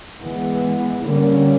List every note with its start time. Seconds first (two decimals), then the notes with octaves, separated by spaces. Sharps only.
0.22 E3 G#3 B3
1.05 D3 G3 A#3 C#4